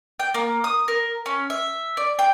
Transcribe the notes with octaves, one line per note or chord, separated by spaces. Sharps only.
G5
A#3
D#6
A#4
C#4
E5
D5
G5